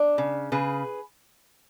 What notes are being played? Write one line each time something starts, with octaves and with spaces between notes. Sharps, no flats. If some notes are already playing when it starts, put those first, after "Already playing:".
Already playing: D4
C#3
C#3 G#4 B4